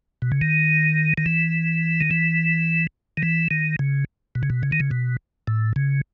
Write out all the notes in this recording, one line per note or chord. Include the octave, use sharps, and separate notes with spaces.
B2
C#3
D#3
D#3
E3
D#3
E3
D#3
E3
D#3
C#3
B2
C#3
B2
C#3
D#3
C#3
B2
A2
C#3